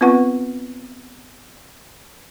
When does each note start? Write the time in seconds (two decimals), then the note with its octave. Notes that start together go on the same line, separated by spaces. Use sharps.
0.01 B3 C4 F4 B4 F#5 C#6